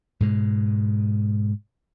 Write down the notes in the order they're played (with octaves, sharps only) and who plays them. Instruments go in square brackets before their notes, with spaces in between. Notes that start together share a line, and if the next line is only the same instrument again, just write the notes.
[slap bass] G#2 B2 G#3